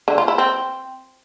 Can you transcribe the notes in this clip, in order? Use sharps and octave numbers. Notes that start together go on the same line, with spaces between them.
D3
F4
E4
C4